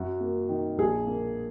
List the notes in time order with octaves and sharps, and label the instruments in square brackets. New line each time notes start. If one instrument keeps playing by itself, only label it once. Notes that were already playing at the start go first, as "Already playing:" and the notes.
Already playing: [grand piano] F#2 [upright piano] F#4
[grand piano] A#3
D#3
[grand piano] A#1 [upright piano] G#4
[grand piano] A#3